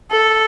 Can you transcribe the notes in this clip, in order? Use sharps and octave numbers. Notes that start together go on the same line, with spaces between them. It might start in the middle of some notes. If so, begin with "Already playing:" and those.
A4